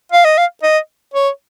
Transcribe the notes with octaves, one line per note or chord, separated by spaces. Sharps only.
F5
D#5
F5
D#5
C#5